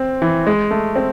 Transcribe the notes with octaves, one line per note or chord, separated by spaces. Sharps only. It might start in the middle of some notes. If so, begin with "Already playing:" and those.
Already playing: C4
E3
G#3
A3
C4